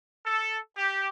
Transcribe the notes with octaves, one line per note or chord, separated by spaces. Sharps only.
A4
G4